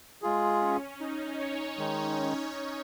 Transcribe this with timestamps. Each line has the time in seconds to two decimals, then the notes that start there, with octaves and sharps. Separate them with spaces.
0.22 G#3 F4 G#4
0.61 C#4
1.00 D#4
1.39 C#5
1.78 D#3 G#3 D#4